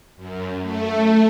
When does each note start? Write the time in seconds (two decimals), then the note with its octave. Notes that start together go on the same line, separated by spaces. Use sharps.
0.17 F#2
0.61 A3